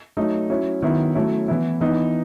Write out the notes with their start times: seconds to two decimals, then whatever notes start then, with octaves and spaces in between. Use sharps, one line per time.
0.17 F#3 A3 D#4
0.49 F#3 C#4 E4
0.82 D#3 F#3 B3 E4
1.15 F#3 A3 C#4 E4
1.48 E3 B3 E4
1.81 E3 B3 D#4